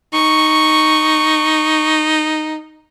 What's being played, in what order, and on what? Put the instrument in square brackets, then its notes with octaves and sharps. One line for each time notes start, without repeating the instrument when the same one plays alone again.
[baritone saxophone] D#4 [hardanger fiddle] C#6